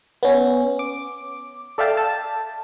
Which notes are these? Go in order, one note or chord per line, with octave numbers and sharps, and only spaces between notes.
B3 C#4
D6
A4 D5 E5 F5 G5 A5
A5